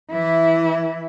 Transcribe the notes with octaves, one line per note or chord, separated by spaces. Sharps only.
E3 E4